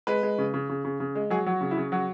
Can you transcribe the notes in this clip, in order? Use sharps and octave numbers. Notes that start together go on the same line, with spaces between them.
G#3 B4
G#3
C#3
C#3
C#3
C#3
C#3
G#3
F#3 G#4
F#3 F#4
C#3
E4
C#3
F#3 F#4